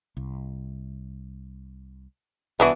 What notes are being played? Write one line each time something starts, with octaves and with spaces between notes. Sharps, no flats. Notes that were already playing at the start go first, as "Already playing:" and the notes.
C2
C2 E3 B3 D4 F#4